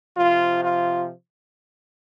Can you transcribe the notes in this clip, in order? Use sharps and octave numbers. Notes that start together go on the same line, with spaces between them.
C3 F3 F4
F4